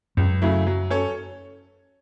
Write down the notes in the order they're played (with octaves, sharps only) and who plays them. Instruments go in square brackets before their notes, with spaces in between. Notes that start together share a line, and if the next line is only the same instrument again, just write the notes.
[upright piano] C#2 [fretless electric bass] F#2
[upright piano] C#3 F#3 A3 E4
F#3
C#4 A4 C#5